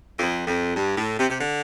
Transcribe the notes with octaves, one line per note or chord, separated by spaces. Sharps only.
F2
F2
G2
A2
C3
C3
D3